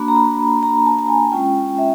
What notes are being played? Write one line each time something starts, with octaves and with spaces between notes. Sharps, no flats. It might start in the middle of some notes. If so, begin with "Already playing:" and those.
Already playing: A#3 D4 F#4 B5
A#5
B5
A#5
A5
A5
G#5
G#3 C#4 F4 G5
E5